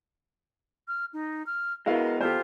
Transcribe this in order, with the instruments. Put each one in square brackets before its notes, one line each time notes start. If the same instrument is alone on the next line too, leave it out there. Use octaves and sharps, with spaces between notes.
[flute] F6
D#4
F6
[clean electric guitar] G#3 B3 [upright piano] E4 F#4 F5 [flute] A#4
[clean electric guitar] E2 [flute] F4 [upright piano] G4 A4 C5